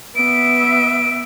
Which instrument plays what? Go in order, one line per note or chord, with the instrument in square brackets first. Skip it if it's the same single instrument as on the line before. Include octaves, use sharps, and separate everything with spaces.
[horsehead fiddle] B3 E5 [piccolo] D7